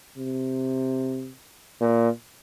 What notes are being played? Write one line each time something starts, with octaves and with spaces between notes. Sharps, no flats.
C3
A#2